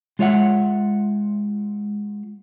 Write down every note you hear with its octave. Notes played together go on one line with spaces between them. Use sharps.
G#3 F4 C#5 E5 F#5